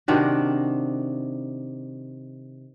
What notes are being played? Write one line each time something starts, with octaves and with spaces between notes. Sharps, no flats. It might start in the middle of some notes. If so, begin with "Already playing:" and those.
C3 D#3 D4 F#4